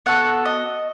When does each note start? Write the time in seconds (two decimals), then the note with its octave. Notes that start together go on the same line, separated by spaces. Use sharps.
0.06 B3 F#4 A4 F#5
0.45 D#5